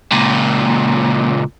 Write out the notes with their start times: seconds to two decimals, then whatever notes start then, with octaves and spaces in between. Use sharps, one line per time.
0.12 C#2 A#2